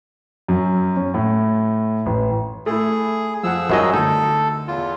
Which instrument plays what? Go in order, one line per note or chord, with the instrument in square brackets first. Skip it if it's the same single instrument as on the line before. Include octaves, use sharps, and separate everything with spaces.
[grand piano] F#2
C#4
A2
A1
[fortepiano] A3 E4 [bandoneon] G#4
[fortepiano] F2 F#5 [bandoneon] F3 G#4 E6
[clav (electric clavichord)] F#2 F#3 D#5 [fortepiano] G3 D#4
[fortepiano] D2 [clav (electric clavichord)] D#4 [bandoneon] A4
[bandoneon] E2 F4